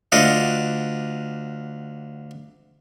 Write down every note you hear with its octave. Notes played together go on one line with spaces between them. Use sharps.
D2 F4 D5 D#5 F#5